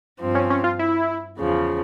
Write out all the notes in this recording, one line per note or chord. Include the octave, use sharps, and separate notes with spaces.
G2 F3 C4
C#4
C#4
F4
E4
E2 C#3 F3